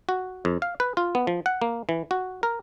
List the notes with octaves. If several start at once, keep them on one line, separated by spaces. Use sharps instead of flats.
F#4
F2
F5
B4
F4
B3
F3
F#5
A#3
E3
F#4
A#4